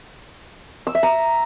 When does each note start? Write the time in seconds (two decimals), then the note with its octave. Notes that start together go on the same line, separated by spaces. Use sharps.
0.87 E6
0.95 E5
1.03 A#5